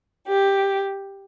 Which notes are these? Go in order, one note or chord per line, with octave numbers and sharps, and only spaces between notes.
G4